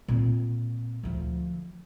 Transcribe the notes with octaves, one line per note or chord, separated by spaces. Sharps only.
A#2 C4
D2 F3